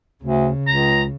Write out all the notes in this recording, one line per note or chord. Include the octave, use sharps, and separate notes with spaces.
D2 C#3
C#2 A#5